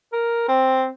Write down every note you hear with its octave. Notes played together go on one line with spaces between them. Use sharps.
A#4
C4